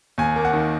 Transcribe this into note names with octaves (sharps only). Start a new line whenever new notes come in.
D#2 G#5
A#3
F#5
D#3